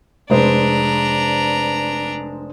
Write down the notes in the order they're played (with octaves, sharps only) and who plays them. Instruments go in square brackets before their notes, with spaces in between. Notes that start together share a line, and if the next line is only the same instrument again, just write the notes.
[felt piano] F1 G#3 C5 [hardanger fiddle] D4 A#5